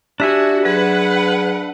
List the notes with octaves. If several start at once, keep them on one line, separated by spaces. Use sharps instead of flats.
D4 F#4 G4 E5 G#5
F#3 G#4 B4 F#5